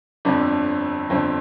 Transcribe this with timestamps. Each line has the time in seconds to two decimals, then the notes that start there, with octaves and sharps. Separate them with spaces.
0.25 G1 F2 D3 F3 C4 D5
1.10 G1 F2 D3 F3 C4